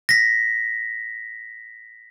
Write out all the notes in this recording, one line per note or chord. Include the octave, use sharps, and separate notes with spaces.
A#6 B6